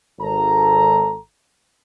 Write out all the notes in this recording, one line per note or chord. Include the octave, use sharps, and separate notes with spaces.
G#1 A4 A#5